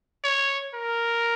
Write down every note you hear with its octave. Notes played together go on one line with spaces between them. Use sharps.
C#5
A#4